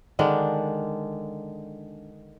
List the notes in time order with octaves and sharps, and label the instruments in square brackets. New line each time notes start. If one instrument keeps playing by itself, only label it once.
[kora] D3 D#3 G#3 D4